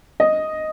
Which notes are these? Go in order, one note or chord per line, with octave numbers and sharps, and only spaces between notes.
D#5